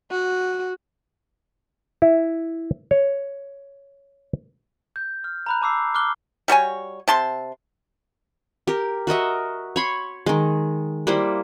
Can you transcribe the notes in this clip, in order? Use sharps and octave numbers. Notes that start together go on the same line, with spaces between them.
F#4
E4
C#5
G6
F6
A#5 B5 F#6
A5 D6 E6 C7
D6 F6 F#6 G7
G3 F#4 C#5 G#5
C3 A5 C6
G4 A#4
F#4 A#4 D#5 E5
C#5 B5 C6
D#3 G#3
G3 A#3 E4 C5